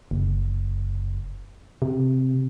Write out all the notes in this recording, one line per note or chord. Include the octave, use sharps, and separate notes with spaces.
F#1
C3